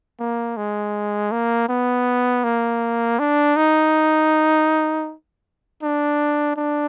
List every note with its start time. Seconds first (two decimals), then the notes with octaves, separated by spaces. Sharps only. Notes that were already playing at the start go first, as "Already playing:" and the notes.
0.20 A#3
0.57 G#3
1.31 A#3
1.69 B3
2.44 A#3
3.19 D4
3.56 D#4
5.82 D4
6.56 D4